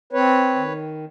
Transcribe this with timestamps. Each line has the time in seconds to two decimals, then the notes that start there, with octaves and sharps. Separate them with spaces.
0.13 C4 B4 C#5
0.55 D#3